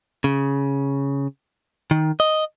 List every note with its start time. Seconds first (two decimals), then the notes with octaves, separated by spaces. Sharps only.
0.24 C#3
1.91 D#3
2.20 D#5